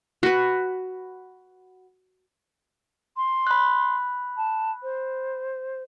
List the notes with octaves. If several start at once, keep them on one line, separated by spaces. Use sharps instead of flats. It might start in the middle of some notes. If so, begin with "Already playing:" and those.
F#4 B4
C6
B5 F#6
A5
C5